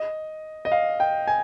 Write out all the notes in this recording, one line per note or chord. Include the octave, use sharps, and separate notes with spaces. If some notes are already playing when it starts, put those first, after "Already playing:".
Already playing: D#5
D#5
F5
G5
G#5